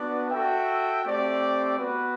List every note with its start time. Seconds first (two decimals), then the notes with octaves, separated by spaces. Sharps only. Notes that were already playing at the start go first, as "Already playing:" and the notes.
Already playing: B3 D4 F#4 B4 D5
0.29 F#4 A4 E5 G5
1.04 A3 C4 G4 D5
1.78 B3 F#4 B4